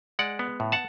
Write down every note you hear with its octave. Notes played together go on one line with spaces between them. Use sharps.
G#3 D5 F#5
B3
A2
F#5 A5